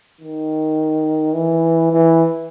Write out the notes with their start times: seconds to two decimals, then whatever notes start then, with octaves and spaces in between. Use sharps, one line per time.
0.21 D#3
1.35 E3
1.92 E3